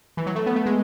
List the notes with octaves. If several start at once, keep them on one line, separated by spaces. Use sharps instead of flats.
E3
F#3
A3
B3
A3
G#3